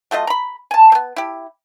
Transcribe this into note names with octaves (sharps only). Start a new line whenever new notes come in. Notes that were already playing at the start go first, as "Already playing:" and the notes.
F#3 A3 F4 D#5
A#5 B5
G#5 A5
B3 C4
E4 G4